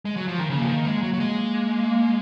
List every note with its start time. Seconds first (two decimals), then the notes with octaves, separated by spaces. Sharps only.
0.05 G#3
0.17 F#3
0.28 F3
0.39 D#3
0.50 C#3 A#3
0.60 F3
0.68 D#3
0.85 G#3
1.03 F#3
1.13 F#3
1.20 G#3
1.90 A#3